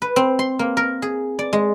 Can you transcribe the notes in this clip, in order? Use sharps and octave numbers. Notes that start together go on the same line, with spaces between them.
B4
C4
C6
A#3
A#4
G#4
D5
G#3